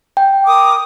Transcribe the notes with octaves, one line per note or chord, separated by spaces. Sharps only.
G5
A#4 D6 D#6